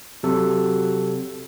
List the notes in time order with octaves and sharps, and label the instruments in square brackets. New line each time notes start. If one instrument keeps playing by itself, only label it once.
[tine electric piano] C3 A4 [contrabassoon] F#3